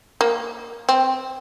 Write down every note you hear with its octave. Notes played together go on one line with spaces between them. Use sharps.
A#3
C4